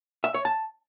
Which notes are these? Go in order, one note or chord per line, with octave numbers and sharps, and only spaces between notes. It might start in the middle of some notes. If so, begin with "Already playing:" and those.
E5
C#5
A5